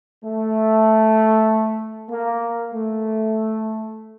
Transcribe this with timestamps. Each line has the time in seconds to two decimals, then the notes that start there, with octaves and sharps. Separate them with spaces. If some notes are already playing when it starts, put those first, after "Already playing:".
0.23 A3
2.09 A#3
2.72 A3